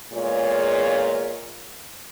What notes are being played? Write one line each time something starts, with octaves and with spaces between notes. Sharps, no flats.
E2 A#2 G#3 F4 G#4 C#5